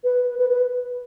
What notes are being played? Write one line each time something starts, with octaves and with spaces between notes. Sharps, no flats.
B4
B4
B4